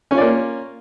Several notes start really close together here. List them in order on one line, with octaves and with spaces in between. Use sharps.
C#4 F4 D5 A#3